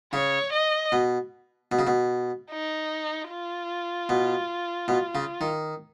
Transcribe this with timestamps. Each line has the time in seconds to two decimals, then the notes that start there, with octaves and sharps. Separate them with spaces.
0.13 C#3 C#5
0.53 D#5
0.92 B2
1.72 B2
1.79 C#3
1.87 B2
2.51 D#4
3.30 F4
4.09 B2
4.88 B2
5.15 C#3
5.41 D#3